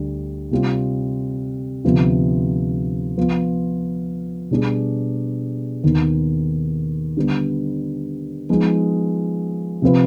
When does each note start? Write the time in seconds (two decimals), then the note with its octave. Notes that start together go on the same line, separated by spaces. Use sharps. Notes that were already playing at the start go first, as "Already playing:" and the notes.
Already playing: D2 D3 G3 D4
0.51 C3 G3 C4 F4
1.85 D2 C3 F3 B3 F4
3.17 F3 B3 F4
4.51 B2 G3 B3 D4 G#4
5.83 D#2 D#3 B3
7.17 D3 G3 B3
8.49 F3 G#3 B3 D#4
9.82 C3 F3 C4 F4 B4